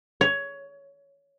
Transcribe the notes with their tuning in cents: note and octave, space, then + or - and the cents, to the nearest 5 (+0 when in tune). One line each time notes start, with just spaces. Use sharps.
C#5 +15